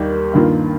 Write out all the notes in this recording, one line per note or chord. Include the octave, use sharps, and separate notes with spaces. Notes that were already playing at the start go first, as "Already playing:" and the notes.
Already playing: D#2 D#3 G3 D#4 G4
G2 D#3 A#3 F4